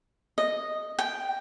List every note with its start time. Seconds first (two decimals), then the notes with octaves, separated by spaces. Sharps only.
0.38 D#5
0.99 G5